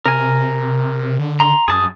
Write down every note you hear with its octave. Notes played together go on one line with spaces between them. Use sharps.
C3 A#4 G#5
D3
A#5 C6
F#2 G#4 A5 D#6